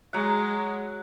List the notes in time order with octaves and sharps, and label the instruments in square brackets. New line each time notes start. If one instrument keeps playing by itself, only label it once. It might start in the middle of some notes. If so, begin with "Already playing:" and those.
[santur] F#3 F#5 [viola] G#3